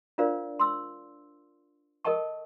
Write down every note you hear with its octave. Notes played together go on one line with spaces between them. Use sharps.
D4 F4 A#4 C5 D5 F5
C6 E6
A4 A#4 D#5 G5 A5 C#6